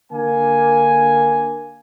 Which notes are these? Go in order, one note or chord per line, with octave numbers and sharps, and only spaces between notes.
D3 A#3 G#5